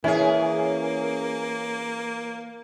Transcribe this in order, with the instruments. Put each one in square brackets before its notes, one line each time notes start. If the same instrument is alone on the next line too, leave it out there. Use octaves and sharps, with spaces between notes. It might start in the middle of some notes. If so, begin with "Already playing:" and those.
[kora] E3 [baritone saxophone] A#3 [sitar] C#4 G#4